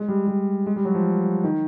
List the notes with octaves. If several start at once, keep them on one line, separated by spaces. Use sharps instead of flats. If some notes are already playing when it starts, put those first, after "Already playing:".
Already playing: G#3
G3
G3
G#3
G3
F#3
F3
D#3